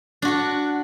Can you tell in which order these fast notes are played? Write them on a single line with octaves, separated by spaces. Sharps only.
D4 F#4 F#5